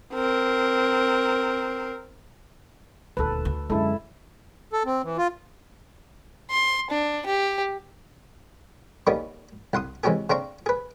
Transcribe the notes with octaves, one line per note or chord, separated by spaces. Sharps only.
C4 A#4
D#1 D2 A4 B4
D2
F#2 D3 G#3 E4 A4
A4
C4
E3
F4
C6
D4
G4
G3 A#3 B3 C#4 D#4 G#4
C2 F#5 C6 D#6
C3 E3 G#3 C#4 G4 G#4
C#3 C4 D4 A#5 C6 C#6
G#4 B4